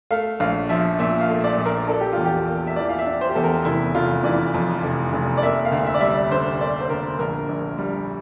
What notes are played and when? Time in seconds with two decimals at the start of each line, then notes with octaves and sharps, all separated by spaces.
0.11 A3 F5
0.40 A#1 F5
0.69 F3 E5
0.99 A#2 E5
1.21 F5
1.29 A3
1.44 D5
1.58 A#1
1.65 A#4
1.88 D4 A4
2.00 G4
2.13 E2 F4
2.25 G4
2.47 A#3
2.67 E5
2.76 E3 D5
2.89 F5
2.99 E5
3.06 D4
3.21 C5
3.29 G4
3.35 E2 A4
3.43 A#4
3.65 F1 E4
3.95 F1 F4
4.24 E3 D5
4.54 F2
4.83 F1
5.13 F1
5.37 D5
5.42 A#3 E5
5.65 F5
5.72 D2
5.87 E5
5.94 D5
6.01 G3 E5
6.09 D5
6.30 D3 C5
6.60 A#3 D5
6.81 C5
6.89 D2 A#4
7.19 A#1 A#4
7.49 A#1
7.78 G3